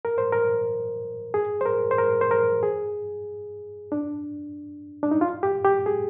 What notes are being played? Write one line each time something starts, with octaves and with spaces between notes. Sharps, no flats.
A#4
C5
A#4
G#4
C5
A#4
C5
A#4
C5
A#4
G#4
D4
D4
D#4
F4
G4
G4
G#4